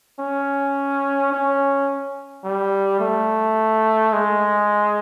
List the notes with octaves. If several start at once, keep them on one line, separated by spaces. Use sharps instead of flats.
C#4
C#4
G3
A3
G#3